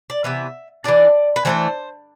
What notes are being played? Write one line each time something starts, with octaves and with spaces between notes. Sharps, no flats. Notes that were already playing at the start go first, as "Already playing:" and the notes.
D5
C3 E3 B3 E5
E3 B3 D4 D5
B4
E3 A3 D4 C5